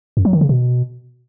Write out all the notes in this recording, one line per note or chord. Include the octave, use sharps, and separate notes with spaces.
F#2
F#3
D#3
C#3
B2